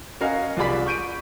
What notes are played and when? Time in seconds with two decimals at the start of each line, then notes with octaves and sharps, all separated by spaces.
0.20 C#4 F#4 A#4 D#5 F5 G#5
0.57 C2 F4 G#4 D5 B5 B6
0.86 C#6 G6 D7 D#7